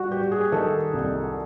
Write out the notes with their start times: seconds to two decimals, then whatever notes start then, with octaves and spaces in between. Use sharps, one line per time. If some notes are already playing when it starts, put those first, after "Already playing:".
Already playing: G3 F#4
0.11 G3 G4
0.32 G#4
0.52 D#3 A4
0.93 C2